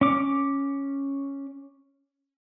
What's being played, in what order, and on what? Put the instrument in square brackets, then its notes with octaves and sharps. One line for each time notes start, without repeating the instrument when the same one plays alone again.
[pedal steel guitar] C#4 D6